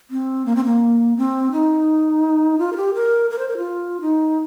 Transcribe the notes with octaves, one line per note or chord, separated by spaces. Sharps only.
C4
A#3
C4
A#3
C4
D#4
F4
A#4
G4
A#4
A#4
C5
A#4
F4
D#4